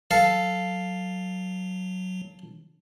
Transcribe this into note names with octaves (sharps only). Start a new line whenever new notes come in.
F#3 A4 F5